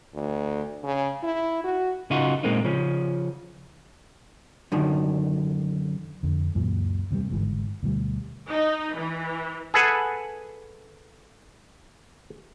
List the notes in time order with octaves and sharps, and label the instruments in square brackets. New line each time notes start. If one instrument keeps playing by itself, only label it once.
[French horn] D2
C#3
E4
F#4
[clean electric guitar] C#3 D#4 F4 F#4
A#2 G#3 A#3 C4 D#4
C#3 F3 C#4
[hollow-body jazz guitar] F#2 D3 D#3
[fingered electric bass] F2 D3
C#2 F#2 A#2 E3
D#2 C3 D#3 G3
G1 G#2 E3
D2 B2 D#3 G3
[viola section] D#4
E3
[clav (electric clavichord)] G#4 A4 B4 F#5 G#5